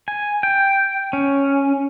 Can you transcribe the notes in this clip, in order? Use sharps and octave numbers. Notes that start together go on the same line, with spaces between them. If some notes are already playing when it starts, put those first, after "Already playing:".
G#5
G5
C#4